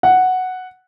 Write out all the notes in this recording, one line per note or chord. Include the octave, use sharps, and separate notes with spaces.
F#5